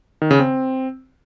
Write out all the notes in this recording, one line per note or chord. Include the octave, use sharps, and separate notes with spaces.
D#3
C#3
C4